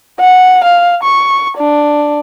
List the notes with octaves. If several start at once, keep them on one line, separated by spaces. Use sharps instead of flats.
F#5
F5
C#6
D4